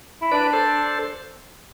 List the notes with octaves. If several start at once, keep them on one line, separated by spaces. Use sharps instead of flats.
E4
D4 B4 D5
A4 C5